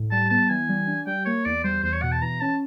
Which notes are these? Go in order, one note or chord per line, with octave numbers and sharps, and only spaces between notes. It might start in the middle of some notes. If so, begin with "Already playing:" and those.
Already playing: A2
G3 A5
B3 A5
E3 G#5
G3
D4
G3 G5
A#3 C#5
E2 D5
G3 C5
E2 C5
C#5
B2 F#5
A5
E3 A#5
C#4 A5